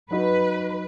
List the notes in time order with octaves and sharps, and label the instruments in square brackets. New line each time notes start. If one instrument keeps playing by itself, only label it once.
[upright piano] F#3 D#4 F#4 [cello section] B4